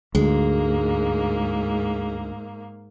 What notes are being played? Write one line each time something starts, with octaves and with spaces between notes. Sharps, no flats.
D2 G#2 G#3 A#3